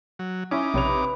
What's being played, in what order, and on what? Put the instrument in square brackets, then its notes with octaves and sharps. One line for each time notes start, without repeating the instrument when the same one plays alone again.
[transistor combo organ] F#3
[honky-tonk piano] C#4 E4 [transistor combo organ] D#4 D6
[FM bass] A#1 [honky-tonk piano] C3 C#5 F7 [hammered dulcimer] B4